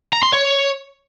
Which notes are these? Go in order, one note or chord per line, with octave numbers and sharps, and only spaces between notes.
A#5
C6
C#5